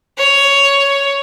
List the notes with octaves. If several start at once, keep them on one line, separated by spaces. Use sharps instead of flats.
C#5